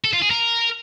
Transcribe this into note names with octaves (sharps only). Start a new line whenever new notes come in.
A4
F4
G#4
A#4